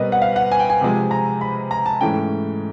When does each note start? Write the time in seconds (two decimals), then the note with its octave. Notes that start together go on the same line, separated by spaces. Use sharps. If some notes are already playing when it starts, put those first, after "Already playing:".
Already playing: B2 G3 C4 A#4 B4 D#5
0.12 F#5
0.22 F5
0.36 F#5
0.52 G#5
0.60 G5
0.70 G#5
0.81 C3 F3 G#3 C4
1.11 A#5
1.41 B5
1.71 A#5
1.86 A5
2.01 G#2 E3 A3 C#4 G5